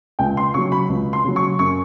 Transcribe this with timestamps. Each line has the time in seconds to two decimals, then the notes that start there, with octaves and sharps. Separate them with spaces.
0.19 C#2 G5
0.37 C6
0.54 C#3 F#3 C#6
0.72 B5
0.89 C#2
1.13 C6
1.24 C#3 F#3
1.36 C#6
1.59 F#2 C#6